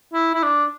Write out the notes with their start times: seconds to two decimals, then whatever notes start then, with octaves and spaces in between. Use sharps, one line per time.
0.14 E4
0.35 E4
0.43 D4